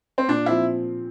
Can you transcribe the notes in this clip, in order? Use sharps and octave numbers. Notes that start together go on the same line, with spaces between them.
C4
A#2 D4
F3 C4 E4